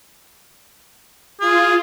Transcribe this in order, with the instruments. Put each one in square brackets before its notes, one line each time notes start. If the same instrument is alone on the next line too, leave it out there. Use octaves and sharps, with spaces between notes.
[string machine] F4 [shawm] G#4